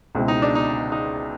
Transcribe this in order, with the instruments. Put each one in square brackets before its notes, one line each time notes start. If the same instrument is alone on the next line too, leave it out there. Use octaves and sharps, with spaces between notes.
[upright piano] C#2 B2 G#3 C4 E4
[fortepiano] D#4
D4
D#4
D#4